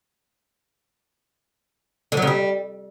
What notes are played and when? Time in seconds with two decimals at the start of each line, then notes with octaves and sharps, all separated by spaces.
2.12 D3
2.17 F#3
2.22 C#3
2.27 G3